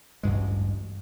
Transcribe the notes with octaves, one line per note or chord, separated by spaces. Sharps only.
A1 D2 G2 G#3